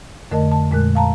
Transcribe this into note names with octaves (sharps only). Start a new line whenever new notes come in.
F2 D3 A3 A#4 D#5 A5
A5
F2 A#2 G#3 A#4 F#6
F5 A5 A#5